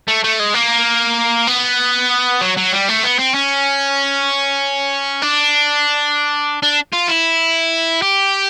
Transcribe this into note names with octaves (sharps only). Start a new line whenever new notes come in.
A3
A3
G#3
A#3
B3
F#3
F#3
G3
A3
B3
C4
C#4
D4
D4
F4
E4
G4